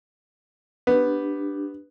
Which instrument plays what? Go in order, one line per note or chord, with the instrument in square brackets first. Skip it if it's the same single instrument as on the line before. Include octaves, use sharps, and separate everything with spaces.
[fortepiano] B3 [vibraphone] D4 G4